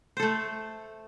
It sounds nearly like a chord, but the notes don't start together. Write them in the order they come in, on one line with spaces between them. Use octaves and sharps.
C5 A4 A3